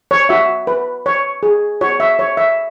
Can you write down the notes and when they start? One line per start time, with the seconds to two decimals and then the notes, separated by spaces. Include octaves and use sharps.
0.11 C#5
0.29 F#4 E5
0.67 B4
1.06 C#5
1.43 G#4
1.81 F#4 C#5
2.00 E5
2.19 C#5
2.37 E5